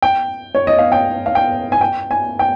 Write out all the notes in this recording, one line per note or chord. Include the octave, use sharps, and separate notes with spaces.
G5
C#5
D#5
F5
G5
F5
G5
G#5
G5
G#5
G5